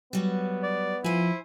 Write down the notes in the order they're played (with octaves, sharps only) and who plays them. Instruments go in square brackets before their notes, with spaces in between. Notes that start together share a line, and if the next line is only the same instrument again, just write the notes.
[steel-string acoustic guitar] F#3 G3 [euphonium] B3
[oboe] D5
[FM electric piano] F3 [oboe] E4 [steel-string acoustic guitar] C5 G#5